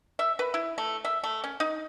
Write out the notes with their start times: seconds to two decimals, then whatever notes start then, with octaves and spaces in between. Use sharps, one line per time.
0.19 E5
0.39 B4
0.54 E4
0.78 A3
1.05 E5
1.24 A3
1.44 C#4
1.60 D#4